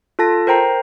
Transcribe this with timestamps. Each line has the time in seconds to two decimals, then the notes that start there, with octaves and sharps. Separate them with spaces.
0.19 F4 A4 A5 A#6
0.47 A#4 C5 G5 A#5 C7